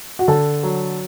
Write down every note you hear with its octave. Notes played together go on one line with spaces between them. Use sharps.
F#4
D3 A4
F#3